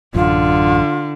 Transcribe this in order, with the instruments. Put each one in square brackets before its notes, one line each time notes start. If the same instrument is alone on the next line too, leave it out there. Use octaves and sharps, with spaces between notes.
[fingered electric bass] A1 F#2 [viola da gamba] D3 [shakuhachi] F4